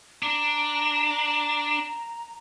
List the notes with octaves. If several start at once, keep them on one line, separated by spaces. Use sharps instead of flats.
D4 A#5